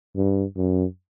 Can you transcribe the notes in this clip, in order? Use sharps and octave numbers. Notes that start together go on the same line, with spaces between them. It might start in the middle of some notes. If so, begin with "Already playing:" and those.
G2
F#2